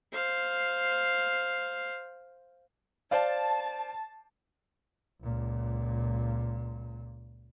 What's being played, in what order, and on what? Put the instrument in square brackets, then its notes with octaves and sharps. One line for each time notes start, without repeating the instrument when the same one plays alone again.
[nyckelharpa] C5 F5
[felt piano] C5 D5 F5 [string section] A5
[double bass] C#2 A#2